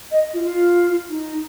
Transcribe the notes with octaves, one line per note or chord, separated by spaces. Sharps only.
D#5
F4
F4
D#4